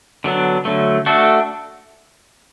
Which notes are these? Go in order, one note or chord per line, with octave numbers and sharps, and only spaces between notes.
D3 F#3 B3 D4
D3 F#3 A3
A3 D4 F#4 A4